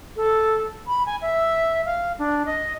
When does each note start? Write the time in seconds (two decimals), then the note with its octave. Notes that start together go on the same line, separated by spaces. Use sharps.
0.16 A4
0.87 B5
1.06 G#5
1.22 E5
1.86 F5
2.19 D4
2.46 D#5